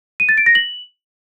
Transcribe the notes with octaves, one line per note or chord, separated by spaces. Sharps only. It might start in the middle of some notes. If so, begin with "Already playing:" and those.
D#7
A6
D7
A#6
F#7